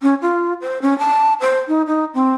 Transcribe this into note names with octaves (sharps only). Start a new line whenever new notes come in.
C#4
F4
C5
C#4
A5
C5
D#4
D#4
C4